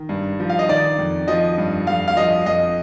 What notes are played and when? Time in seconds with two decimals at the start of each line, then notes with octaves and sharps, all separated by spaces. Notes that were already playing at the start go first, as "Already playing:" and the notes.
Already playing: D#3
0.09 G2
0.40 F3
0.49 F5
0.59 D#5
0.69 D#3 D5
0.98 F2
1.28 F3 D#5
1.58 G2
1.87 F2 F5
2.08 F5
2.17 F3 D#5
2.46 F2 D#5